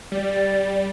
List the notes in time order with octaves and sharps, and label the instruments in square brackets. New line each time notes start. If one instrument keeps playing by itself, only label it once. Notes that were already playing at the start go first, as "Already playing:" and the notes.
[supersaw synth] G3 [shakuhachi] D5